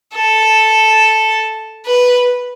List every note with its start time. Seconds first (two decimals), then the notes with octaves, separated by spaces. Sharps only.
0.14 A4
1.86 B4